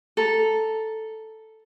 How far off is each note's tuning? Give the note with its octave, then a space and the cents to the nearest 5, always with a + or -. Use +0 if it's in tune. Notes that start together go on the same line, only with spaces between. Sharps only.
A4 +0 A#5 +0